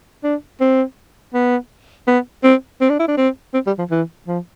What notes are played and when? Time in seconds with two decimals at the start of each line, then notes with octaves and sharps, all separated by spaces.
0.24 D4
0.60 C4
1.34 B3
2.07 B3
2.44 C4
2.81 C4
2.89 D4
2.99 E4
3.08 D4
3.17 C4
3.54 C4
3.67 G3
3.78 F3
3.91 E3
4.27 F3